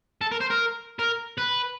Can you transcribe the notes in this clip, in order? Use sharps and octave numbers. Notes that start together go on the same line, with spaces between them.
A4
A#4
C5
A#4
A#4
B4